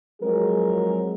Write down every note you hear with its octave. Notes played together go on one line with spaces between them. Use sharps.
F3 F#3 G#3 C4 G#4 A#4